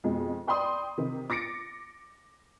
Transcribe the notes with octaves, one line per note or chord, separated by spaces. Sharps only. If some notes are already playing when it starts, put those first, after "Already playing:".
F2 B2 G#3
D5 G5 B5 C6 D#6
C3 D#3
D6 A6 A#6 C#7 D7